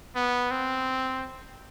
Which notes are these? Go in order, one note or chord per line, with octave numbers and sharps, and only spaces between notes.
B3
C4